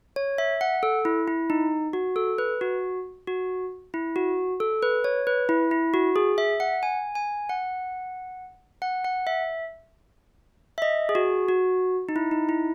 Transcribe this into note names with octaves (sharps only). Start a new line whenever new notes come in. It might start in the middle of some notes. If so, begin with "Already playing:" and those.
C#5
E5
F#5
A4
E4
E4
D#4
F#4
A4
B4
F#4
F#4
E4
F#4
A4
B4
C#5
B4
E4
E4
F#4
G#4
E5
F#5
G#5
G#5
F#5
F#5
F#5
E5
E5
D#5
G#4
F#4
F#4
D#4
E4
D#4
E4